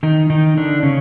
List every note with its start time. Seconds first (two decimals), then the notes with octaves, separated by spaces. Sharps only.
0.03 D#3 D#4
0.30 D#3 D#4
0.57 D3 D4
0.83 C#3 C#4